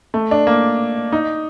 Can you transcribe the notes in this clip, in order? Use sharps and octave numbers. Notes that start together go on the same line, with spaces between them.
A3
D4
A#3
D#4